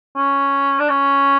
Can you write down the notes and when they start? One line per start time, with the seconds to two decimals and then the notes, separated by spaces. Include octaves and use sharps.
0.16 C#4
0.79 D4
0.89 C#4